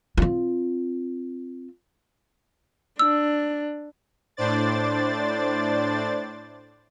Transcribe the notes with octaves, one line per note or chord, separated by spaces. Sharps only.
C4 F4
D4 E6
A2 D4 C5 D5 A6